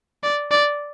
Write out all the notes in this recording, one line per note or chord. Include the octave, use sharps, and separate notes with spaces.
D5
D5